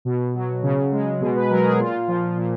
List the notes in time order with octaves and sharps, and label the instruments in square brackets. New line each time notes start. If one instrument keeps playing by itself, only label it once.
[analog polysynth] B2
F#3
C#3
G#3
B2 G#4
B4
F#3 A#4
G#4
A#2 F4
F3
A#2